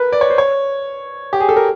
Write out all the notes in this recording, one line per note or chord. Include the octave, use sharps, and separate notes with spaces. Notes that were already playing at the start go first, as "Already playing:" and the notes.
Already playing: A#4 B4
D5
C#5
C5
C#5
G4
G#4
A4
A#4